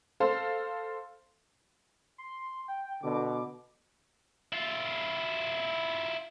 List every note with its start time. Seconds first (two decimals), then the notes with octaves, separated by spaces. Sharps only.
0.20 A4 C5 F5
2.18 C6
2.68 G5
3.03 B2 D3 D6
4.53 E4 F4